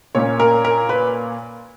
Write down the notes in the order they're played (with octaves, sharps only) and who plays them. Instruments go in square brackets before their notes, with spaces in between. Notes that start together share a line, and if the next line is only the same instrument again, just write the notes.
[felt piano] A#2 A#3 C#4 C#5
A#4
A#4
B4